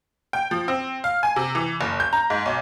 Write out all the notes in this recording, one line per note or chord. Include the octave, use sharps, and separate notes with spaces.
G5
F3
C4
F5
G#5
C3
E3
F#1
G6
A#5
G#2
B1